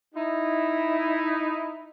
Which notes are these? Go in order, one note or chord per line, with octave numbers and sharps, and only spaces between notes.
D#4 E4